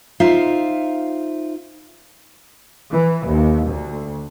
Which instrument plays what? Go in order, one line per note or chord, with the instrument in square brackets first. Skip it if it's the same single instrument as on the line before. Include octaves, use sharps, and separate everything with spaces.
[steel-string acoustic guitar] D#4 F4 C5 E5 F5
[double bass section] E3
D#2
D2